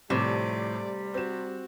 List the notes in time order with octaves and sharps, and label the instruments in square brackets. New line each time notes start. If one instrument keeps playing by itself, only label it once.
[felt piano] A2 F3 [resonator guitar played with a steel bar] C3 [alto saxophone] G3 [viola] A3 D5
[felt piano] C4 E7 [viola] F#4